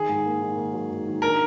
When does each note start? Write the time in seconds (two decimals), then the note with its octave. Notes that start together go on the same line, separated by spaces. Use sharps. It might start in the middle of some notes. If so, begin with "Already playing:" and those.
Already playing: D#3 G#4
0.09 G#2
0.26 A#3
0.42 D#3
0.57 A#3
0.73 F#3
0.91 G#2
1.07 D#3
1.22 D4 A#4